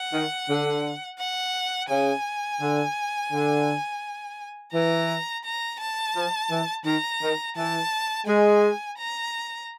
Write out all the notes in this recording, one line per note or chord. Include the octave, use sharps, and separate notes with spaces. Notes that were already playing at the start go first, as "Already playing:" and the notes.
Already playing: F#5
D#3
D3
F#5
C#3 G#5
D3
D3
E3 A#5
A#5
A5
F3
E3
D#3 A#5
D#3
E3 A5
G#3 G#5
A#5